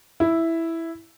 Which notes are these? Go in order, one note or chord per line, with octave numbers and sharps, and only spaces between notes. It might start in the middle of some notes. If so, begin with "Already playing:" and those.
E4